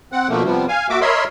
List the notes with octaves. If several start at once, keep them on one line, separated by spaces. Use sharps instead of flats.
C4 F#5
B2 D3 F3 A3 A#3
C3 F3 G3 B3
F5 G#5
A#3 F#4 E5 D6
A#4 C#5 D#5 E5 B5 C6